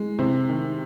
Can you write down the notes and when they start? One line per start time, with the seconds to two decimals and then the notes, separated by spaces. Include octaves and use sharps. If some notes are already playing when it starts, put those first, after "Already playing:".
Already playing: G#3
0.19 C3 C5
0.49 D#3